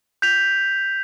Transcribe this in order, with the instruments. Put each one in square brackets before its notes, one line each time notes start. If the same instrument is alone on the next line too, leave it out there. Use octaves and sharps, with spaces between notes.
[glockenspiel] G6 B6 F7